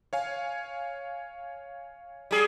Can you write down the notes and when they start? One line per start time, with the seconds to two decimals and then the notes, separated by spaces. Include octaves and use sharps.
0.13 C#5 F5 G#5
2.31 G3 G#4